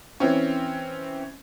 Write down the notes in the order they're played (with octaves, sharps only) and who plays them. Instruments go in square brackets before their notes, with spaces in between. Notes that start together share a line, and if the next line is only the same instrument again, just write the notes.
[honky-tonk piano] E3 C4 C#4